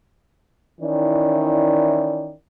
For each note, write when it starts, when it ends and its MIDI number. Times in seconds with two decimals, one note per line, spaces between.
0.81 2.32 51
0.81 2.32 52
0.81 2.32 61
0.81 2.32 64
0.81 2.32 74